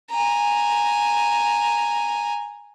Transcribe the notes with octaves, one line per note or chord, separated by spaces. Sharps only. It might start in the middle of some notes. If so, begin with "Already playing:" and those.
G#5 A#5